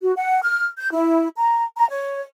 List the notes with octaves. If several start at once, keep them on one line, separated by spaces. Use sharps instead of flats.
F#4
F#5
F6
G6
E4
A#5
A#5
C#5